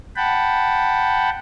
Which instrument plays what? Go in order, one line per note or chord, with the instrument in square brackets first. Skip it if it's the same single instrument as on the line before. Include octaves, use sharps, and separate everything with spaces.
[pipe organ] F#5 G5 A5 B5